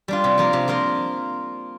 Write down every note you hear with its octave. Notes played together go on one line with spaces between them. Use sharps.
G3 D4 F4
C3
F3 A#3 F4 A#4
C3
F3 A#3 F4 A#4